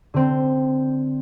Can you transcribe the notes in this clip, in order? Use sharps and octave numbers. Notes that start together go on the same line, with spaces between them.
D3 C4